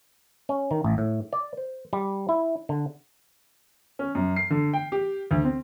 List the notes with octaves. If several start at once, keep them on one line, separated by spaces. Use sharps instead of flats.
C#4
D#3
A1
A2
D5
C5
G3
E4
D3
C#4
F#2
C7
D3
G5
G4
D2
C4